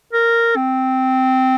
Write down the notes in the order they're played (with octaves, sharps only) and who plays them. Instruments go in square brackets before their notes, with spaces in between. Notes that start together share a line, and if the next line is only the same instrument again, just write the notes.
[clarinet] A#4
C4